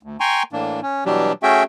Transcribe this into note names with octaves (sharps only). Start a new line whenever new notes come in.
D2
G5 G#5 A#5 C6 C#6
A2 E3 A#3 D4
C#4
B2 E3 F#3 G3 D4 G4
A3 C#4 F#4 G#4 E5 G5